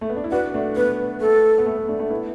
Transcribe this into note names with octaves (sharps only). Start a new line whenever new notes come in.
A3
B3
D4
E4
D4 F#4 B4
A3 D4
B3 B4
A3 A4
B3
A3
B3
A3 D4
A3 D4
B3 E4